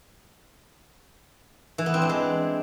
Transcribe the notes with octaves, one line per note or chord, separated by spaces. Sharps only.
E3
B3
C4
D4
G#3